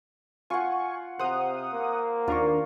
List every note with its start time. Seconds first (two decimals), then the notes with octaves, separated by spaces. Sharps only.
0.50 F4 F#5 G#5 C#6
1.19 C3 C5 F#5 A#5 D#6
1.73 A#3
2.28 D#2 D4 F4 A#4 C#6